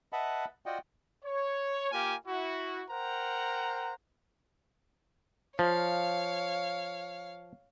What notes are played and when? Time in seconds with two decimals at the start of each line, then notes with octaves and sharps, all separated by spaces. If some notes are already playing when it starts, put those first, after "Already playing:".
0.13 B4 D#5 E5 F#5 A5 B5
0.66 F4 F#4 D5 D#5 F#5 G5
1.24 C#5
1.91 A#3 F4 G4 A#4 G#5
2.26 E4 F#4
2.89 A#4 C5 F#5 G5 A#5
5.59 F3 C#5 F5